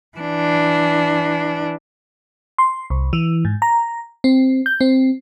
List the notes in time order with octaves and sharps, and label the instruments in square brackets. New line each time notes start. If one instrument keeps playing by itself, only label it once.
[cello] E3 D4
[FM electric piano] C6
C2
E3
G#2
A#5
C4
G6
C4